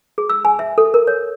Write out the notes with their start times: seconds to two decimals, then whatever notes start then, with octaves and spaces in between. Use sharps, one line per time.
0.18 G#4
0.29 E6
0.45 G#5
0.59 E5
0.78 A4
0.94 A#4
1.07 C#5